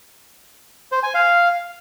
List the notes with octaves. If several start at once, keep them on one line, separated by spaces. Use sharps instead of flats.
C5
G#5
F5